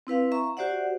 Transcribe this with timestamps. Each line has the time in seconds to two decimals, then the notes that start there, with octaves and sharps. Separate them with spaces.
0.07 C4 E4 B4 F5
0.32 E5 A#5 C#6
0.57 F#4 G4 C5 D5 E5 F#5